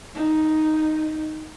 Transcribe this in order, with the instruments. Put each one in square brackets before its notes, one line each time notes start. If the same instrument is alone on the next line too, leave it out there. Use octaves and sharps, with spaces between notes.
[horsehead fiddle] D#4